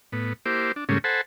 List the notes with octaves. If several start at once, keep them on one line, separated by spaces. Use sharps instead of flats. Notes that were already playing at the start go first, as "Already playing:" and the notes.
A2 B3
A#3 E4 G4 C5 D6
D4
G#2 C#3 G3 A3 A#3 C#4
A4 C5 F#5 G#5 A5 B5